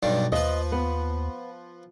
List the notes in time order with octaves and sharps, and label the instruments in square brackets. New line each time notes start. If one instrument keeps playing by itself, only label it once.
[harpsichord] B1 G2 G3
[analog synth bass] D#2 [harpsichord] F3 B4 [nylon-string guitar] D#5
[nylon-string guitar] B3